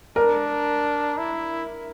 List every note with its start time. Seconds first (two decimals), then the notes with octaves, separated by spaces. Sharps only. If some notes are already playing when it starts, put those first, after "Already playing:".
0.16 D4 A#4
1.18 E4